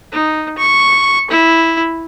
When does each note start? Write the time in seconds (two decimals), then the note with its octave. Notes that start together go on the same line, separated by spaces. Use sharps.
0.12 D#4
0.59 C#6
1.31 E4